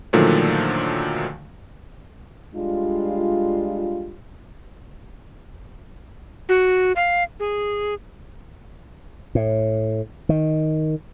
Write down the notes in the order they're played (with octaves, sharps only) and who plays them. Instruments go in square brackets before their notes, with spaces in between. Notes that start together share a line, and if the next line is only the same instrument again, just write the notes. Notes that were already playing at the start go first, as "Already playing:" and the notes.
[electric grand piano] A#2 D3 D#3 F3 F#3 A3
[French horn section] G3 G#3 D4 F4
[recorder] F#4
F5
G#4
[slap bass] A2
D#3